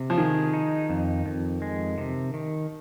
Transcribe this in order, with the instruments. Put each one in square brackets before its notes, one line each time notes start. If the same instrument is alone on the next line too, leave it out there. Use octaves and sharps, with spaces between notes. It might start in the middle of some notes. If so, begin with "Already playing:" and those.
Already playing: [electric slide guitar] C3
[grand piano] F3
[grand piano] D#3 [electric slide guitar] G#4
[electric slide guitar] D#4
F2
F2
G#3
C3
D#3